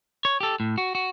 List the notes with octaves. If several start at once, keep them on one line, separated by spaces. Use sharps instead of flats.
C#5
G4 A4
A2
F#4
F#4